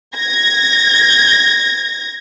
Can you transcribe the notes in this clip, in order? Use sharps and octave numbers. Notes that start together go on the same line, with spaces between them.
G#6 A#6